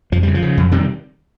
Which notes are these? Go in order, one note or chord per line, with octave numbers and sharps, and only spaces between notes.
F2 F3
C#3 G3
F3
C#3
F2
C3 D#3 G3